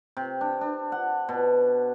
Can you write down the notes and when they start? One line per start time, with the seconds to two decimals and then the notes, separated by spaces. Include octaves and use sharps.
0.17 C3
0.41 D4
0.61 D4
0.92 F#5
1.29 B2